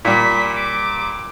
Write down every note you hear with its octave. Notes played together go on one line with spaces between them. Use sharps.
A#2 G3 B6
D6